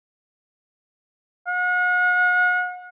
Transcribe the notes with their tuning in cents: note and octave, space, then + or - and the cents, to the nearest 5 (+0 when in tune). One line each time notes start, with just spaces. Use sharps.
F#5 -40